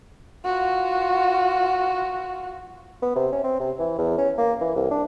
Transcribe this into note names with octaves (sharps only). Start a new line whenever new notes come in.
F4 F#4
B3
C3
C#4
C4
C3
E3
E2
C#4
A#3
E3
C2
D4